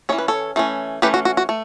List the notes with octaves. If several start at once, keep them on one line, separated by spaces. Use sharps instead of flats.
E3 A3 C#4 C#5
B4
A4 C#5
E3 A3 C#4
E3 A3 C#4 G4 B4
F#4
F#4
F#4
A3